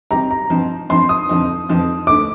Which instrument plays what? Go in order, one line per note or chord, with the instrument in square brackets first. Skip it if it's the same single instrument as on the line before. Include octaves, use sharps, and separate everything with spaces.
[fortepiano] C3 G3 C4 D#4 [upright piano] A#5
[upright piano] A#5
[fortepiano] G2 F3 C4 D#4
[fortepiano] G2 F3 C4 D#4 [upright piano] C6
[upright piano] D#6
[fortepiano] F2 D3 F3 C4 D#4
F2 D3 F3 C4 D#4
[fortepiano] D2 D3 A3 D#4 [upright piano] D6